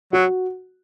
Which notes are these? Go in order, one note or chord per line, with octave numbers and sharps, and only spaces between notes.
F#3 F#4